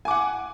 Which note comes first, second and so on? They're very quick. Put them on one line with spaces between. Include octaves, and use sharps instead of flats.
G#5 D6 F#5